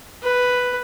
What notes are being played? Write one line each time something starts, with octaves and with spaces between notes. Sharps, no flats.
B4